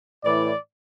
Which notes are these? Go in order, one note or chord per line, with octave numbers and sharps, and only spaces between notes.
A2 E3 D5